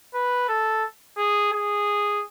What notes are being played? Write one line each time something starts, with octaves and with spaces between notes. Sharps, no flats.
B4
A4
G#4
G#4